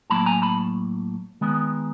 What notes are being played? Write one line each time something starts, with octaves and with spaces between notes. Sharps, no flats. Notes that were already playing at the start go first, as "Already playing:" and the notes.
A2 F#3 A#3 A5 B5
G#5 A#5
A5 B5
D#3 G#3 B3